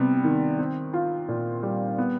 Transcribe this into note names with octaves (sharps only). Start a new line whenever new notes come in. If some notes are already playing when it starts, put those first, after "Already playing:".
Already playing: C3 G3 B3
D#3
C4
F4
A#2
G3
B3